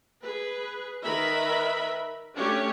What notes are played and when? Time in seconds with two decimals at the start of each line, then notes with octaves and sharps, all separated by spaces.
0.21 G#4 B4
1.04 D#3 A#4 B4 E5 B5
2.35 A3 C#4 D4 G4 C#5